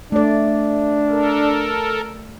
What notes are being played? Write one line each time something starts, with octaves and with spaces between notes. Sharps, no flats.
A3 D4 D5
A4 A#4